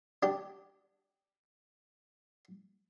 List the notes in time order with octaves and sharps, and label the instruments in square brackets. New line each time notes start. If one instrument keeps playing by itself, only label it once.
[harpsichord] D4 G4